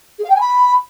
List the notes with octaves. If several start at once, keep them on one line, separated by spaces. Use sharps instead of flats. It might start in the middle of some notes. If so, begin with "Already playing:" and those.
G#4
F5
G5
G#5
B5